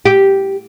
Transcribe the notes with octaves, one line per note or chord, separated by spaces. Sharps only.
G4